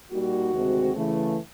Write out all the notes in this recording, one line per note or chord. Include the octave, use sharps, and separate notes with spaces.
A#2 G3 A#3 D#4 F#4
D2 C3 D#3 G#3 C4
C#3 E3 A3